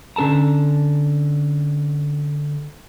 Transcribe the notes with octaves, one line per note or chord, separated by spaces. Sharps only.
D3 C#4 A4 A5 A#5